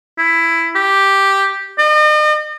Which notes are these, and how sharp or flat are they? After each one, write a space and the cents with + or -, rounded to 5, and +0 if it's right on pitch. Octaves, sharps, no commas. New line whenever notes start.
E4 +10
G4 +0
D#5 -40